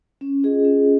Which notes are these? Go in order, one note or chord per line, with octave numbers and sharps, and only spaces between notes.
C#4
F4 G#4 D#5
C#4